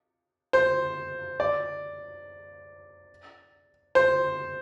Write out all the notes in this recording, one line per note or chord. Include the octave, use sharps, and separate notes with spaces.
C5
D5
C5